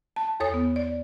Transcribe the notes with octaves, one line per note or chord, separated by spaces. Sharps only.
A5
E2 A4 C#5 D#6
B3
D5